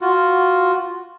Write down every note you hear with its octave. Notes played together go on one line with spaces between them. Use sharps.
F4 F#4